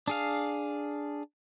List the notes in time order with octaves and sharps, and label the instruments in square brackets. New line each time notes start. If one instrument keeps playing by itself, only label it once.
[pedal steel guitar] D4 G#4 F5